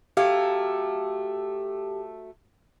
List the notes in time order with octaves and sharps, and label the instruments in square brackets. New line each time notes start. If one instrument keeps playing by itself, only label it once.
[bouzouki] F#3 A3 F5 [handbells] G4